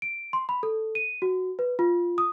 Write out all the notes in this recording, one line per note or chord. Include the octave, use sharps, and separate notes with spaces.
D7
C6
B5
A4
D#7
F#4
B4
F4
D#6